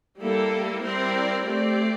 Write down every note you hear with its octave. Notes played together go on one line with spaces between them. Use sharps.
G3 A#3 E4 A4
G3 C4 E4 A#4 D5
A3 C4 G4 D5